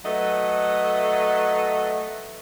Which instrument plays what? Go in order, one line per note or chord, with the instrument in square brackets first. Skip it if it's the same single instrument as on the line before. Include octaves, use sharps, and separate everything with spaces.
[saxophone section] F#3 A3 A4 B4 D#5